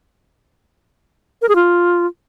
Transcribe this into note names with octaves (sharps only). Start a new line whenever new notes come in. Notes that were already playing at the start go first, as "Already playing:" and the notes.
A#4
G#4
F4